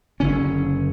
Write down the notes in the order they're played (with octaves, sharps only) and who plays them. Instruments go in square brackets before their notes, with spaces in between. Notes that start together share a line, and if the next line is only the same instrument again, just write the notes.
[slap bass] F#1 D3 C#4